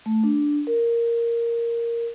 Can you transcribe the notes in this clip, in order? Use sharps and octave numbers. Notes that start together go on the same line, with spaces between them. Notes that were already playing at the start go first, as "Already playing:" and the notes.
A3
D4
A#4